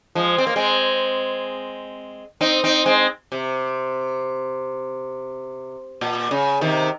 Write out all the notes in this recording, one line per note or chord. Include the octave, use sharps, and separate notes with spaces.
F3 G#3
C4
A#3
G#3 C4
C4 D#4
C4 D#4
G#3 C4
C3
A#2
C#3
C3 D#3